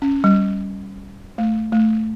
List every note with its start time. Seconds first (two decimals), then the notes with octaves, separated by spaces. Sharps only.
0.02 C#4
0.24 G3
1.38 A3
1.72 A3